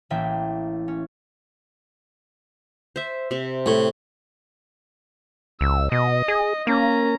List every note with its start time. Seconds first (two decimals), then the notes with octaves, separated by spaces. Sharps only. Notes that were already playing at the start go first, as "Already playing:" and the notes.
0.10 A1 A#3 E4 E5 G5
0.88 C#4
2.96 C5 E5
3.31 C3 E5
3.66 A2
5.61 C#2 E6
5.92 B2 D#5
6.28 G#4
6.67 A#3 C#4 A#5